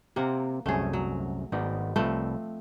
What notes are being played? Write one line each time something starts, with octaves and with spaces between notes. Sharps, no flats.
C3 A#3 C4 G4 F#5
C2 F#2 A3 G#4 C#5
F#3
G#1 B3 D#4 D5
C2 F3 A3 C4 B4